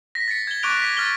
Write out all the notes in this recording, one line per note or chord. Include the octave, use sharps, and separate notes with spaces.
A#6 B6
A6 B6 C#7
G#6 G7
C#6 D6 F#6 D7 F7 G7
B6
F6 F#6 A6 G7